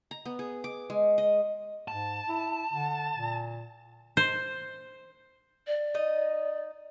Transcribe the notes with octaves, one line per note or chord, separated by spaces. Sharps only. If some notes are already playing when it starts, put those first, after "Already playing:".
A#5
B3
G#4
D6
G#3
D#5
G#2 A5
E4
D3
A#2
C5
D5
D#4 D#5